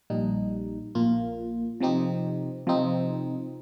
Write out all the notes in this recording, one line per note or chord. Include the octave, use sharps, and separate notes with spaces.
A#1 A#2 G3 D#4
A#1 A#2 A#3 F4
C3 F3 C4 D#4 G4
C3 F3 C4 D#4